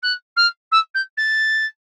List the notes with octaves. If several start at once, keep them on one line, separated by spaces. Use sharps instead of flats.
F#6
F6
E6
G6
A6